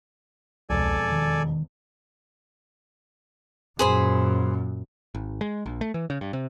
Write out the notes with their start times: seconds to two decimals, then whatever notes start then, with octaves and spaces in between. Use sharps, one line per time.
0.70 E1 C2 F2 A4 D5 G#5
1.11 D#3
3.79 F#2 A#2 G#4 C5 B5
5.15 G#1
5.41 G#3
5.66 A#1
5.81 A3
5.94 E3
6.10 C#3
6.21 G2
6.33 C3